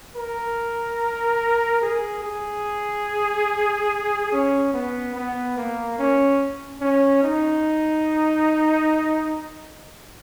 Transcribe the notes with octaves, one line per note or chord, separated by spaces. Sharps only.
A#4
G#4
G#4
C#4
B3
B3
A#3
C#4
C#4
D#4